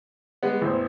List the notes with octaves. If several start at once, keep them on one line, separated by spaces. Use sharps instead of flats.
G3 G#3 B3
A1 E2 E4 C5